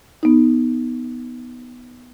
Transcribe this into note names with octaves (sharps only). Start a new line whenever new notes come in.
B3 D#4